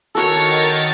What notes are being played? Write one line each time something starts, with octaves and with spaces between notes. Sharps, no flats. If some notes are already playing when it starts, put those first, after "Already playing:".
D#3 F#4 A4 A#4 C#5 A6